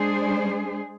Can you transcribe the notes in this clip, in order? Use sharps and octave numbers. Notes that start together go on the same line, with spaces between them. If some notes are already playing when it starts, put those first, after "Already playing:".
Already playing: G#3 D4 G#4 C5